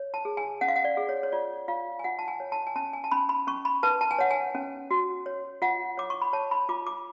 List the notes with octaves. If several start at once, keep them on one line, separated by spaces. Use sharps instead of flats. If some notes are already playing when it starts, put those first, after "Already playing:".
Already playing: C#5
A5
G#4
G#5
C#4 F#5
F5
F#5
D5
G#4
C#5
C#5
F4 D5
F4 F5
G#5
F4 F#5
A5
G#5
C#5
A5
G#5
C#4 A5
G#5
A5
C#4 B5
B5
C#4 C#6
B5
B4 A5
A5
G#5
C#5 F#5
G#5
C#4
F#4
C#5
F4 F#5
C#5 D6
C#6
B5
C#5 A5
B5
F4 D6
D6